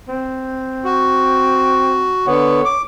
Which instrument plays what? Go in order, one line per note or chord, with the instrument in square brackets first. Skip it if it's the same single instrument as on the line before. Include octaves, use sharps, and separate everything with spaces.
[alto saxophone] C4
[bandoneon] F#4
[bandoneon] D3 B3 [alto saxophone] C#5
[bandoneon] D6